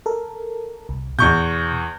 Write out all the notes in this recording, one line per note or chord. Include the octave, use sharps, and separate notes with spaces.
A4 A#4
C2
E2 B2 C#6 G6